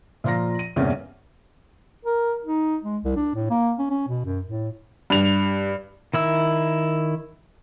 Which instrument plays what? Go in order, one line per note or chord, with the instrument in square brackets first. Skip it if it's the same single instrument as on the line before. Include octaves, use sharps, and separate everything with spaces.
[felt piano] A#2 F3 F4 A#5 A#6
D#7
E2 G2 C3 A#3 C#4
[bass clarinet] A#4
D#4
G#3
C2
D4
A2
A#3
C#4
C#4
B2
F#2
A2
[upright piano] G2 F7
[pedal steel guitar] D#3 E4 E6